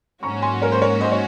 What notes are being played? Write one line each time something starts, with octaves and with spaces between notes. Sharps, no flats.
G#2 F#3 A#3 C#4 F#4 A#5 C#6
G#5 C6
A#4 C#5
C5
A#4 C#5
C5 D#5
C#5